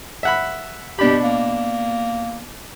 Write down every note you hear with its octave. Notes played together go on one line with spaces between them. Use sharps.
E5 F#5 B5
B2 D4 G4 B5
A#3